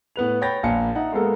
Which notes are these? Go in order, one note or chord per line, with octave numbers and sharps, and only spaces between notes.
A2 B3 B4 F7
C#5 G5 B5 G6 A6 A#6
A#1 A#3 F5 G#5 A5 C#7
D#4 E5 F#5
G#3 A#3 B3 A4 A#4